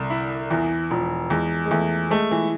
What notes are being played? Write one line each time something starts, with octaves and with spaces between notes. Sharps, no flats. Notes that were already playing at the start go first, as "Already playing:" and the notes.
Already playing: C2 D3
E4
E2 E3
E1 F3
E2 G#3
G#3
E2 A3
G#3 A3
E3